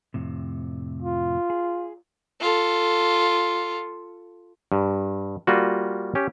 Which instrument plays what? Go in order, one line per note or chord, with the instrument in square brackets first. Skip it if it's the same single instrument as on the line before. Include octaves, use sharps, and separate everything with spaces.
[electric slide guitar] F2 A2 C3
[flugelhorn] F4
[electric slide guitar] G#4
[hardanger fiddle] F4 A4
[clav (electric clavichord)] G2
G3 A#3 F4 F#4
C#4 G4